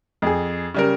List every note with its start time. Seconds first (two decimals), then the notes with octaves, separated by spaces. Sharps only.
0.22 F2 G#4
0.74 C#3 G3 A#4